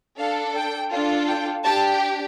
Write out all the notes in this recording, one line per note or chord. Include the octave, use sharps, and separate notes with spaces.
D4 A4 F5
G5
D4 F4 A4
G5
D4 G4 A5